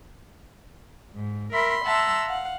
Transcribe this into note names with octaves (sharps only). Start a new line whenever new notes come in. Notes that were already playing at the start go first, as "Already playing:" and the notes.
G#2
A#4 E5 B5 C6
E5 F#5 A5 A#5 C6 E6
F5 F#5